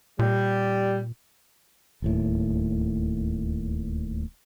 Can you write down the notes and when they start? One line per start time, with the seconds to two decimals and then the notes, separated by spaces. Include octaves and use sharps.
0.19 A#2 G3
2.02 D1 D#2 A2